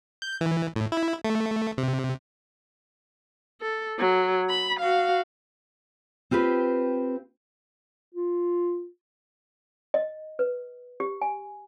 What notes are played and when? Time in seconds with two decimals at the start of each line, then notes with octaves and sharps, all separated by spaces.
0.22 G6
0.41 E3
0.76 A2
0.92 E4
1.25 A3
1.78 C3
3.62 A4
3.99 F#3
4.50 B5
4.80 F#4 F5
6.31 C4 F4 G4 B4
8.14 F4
9.94 D#5
10.39 B4
11.00 G4
11.22 G#5